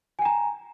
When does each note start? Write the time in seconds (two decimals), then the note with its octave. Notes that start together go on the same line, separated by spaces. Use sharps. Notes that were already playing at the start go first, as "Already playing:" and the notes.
0.19 G#5
0.22 G5
0.25 A#5